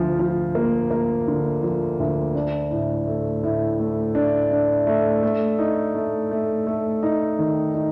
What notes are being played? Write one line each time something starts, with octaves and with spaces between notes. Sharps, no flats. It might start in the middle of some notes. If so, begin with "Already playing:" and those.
Already playing: D2 F3
F3
A#3
A#3
D3
F3
D2
D4
A2
A3
A2
A3
D4
D4
A3
A3
D#4
A3
A3
A3
D#4
D#3
D#4